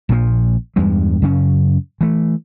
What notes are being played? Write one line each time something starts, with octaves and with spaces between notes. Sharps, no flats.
A#1 A#2 D3 F3
E2 G2 G3 G#3
F#2 C#3 C#4
E3 A3